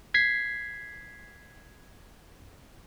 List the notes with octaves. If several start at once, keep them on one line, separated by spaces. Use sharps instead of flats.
G#6 B6 C7